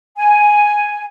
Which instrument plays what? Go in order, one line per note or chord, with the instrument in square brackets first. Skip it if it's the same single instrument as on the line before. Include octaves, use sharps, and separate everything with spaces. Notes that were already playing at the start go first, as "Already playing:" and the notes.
[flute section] G#5